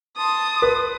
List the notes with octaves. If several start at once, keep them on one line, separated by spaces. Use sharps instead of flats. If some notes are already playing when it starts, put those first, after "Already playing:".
A5 C6 D#6
B4